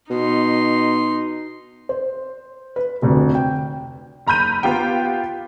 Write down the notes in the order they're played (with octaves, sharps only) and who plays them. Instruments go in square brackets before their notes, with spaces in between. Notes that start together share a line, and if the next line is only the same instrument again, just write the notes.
[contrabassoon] B2 [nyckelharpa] D#4 C6
[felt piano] C5
B4
F1 D2
G5
[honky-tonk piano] F#1 A#5 B5 G6 D#7
B3 F4 G4 G5